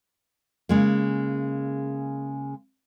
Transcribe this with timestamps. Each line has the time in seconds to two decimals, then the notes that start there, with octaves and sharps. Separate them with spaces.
0.69 C#3 G#3 A#3